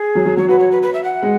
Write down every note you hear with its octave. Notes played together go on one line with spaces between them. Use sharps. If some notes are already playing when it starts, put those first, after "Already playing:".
Already playing: G#4
F#3
F#3
F#3 C#5
F#4 B4
C#5
B4
B4
E5
F#5
G#3